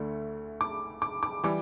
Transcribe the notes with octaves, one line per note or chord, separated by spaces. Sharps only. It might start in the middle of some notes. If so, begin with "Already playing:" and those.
Already playing: D2 D3 A3
D6
D6
D6
E3 G3 D6